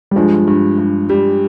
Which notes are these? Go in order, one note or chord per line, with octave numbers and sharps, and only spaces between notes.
G3
G2 F3 G#3
G2
G2
G3